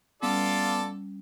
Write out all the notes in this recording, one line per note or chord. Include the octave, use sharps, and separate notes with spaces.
G3 B3 C#4 F4 A4 D5